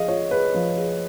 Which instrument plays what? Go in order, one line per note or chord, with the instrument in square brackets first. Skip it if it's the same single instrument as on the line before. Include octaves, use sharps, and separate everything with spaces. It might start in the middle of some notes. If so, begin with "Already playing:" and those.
Already playing: [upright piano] F3 G#4 [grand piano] D#5 F5
[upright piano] F4 [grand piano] C#5
[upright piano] G#4 [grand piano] B4
[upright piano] F3
G#4